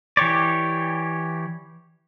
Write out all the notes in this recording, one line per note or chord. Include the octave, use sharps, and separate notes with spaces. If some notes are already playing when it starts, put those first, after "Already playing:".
E3 G4 C#5 D5